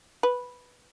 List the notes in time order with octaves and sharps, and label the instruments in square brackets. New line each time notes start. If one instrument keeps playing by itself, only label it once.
[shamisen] B4